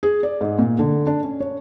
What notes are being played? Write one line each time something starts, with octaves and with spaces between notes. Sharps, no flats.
G#4
D5
G#2
A#2
D3
D4
C#4
C#5